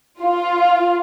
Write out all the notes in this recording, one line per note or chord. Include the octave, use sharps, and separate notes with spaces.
F4